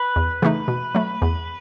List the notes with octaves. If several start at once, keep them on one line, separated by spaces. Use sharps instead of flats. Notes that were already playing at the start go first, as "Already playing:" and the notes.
Already playing: B4
E2
C#3 E3 A3 D#4
B2
F#3 A3
E2